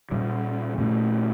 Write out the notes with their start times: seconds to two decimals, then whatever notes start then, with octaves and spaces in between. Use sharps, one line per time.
0.11 A#2 G3 C#4
0.78 A#2 A3 C#4